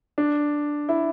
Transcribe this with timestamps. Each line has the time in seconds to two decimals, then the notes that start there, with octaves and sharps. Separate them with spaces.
0.18 D4
0.89 E4